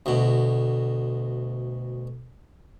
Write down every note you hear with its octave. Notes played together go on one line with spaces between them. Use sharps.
D2 B2